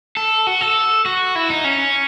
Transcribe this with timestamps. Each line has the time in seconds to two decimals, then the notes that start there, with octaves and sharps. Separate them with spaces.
0.17 A4
0.47 F#4
0.61 A4
1.06 F#4
1.36 E4
1.50 D#4
1.64 C#4